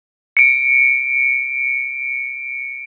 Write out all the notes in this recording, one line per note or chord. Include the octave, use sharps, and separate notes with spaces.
C#7 D7